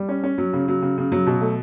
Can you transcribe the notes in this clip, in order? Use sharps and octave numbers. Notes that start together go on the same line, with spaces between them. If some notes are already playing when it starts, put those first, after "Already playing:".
Already playing: G3
C#4
C#4
F#3
C#3
F#3
C#3
C#3
F#3
B2
A3